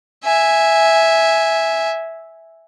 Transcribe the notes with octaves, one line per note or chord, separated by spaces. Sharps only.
E5 G#5